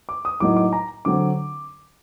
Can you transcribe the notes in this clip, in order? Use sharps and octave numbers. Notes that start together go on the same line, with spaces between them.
D6
D#6
A2 F#3 A#3 D#4 D6
D6
A#5
D3 F#3 C4 D6